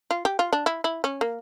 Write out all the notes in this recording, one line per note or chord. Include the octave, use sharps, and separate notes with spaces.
F4
G4
F4
D4
E4
E4
C#4
A#3